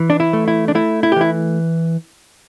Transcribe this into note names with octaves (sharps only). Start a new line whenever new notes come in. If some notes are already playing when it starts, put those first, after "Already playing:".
Already playing: E3
D4
E4
A3
E4
D4
A3 E4
E4
G4
E3 E4